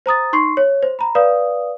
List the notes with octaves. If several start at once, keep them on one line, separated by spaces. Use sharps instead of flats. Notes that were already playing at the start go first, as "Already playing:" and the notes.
C5 A#5 D#6 A6
D#4 C6 C#6 C7
C#5
C5
A#5 B5
B4 D5 F5 D#6